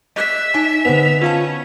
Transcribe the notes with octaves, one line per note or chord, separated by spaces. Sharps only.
D#5 E5 F#6
D#4 D#5 G#5
D3 B3 C5 F7
C#4 F4 F5 A5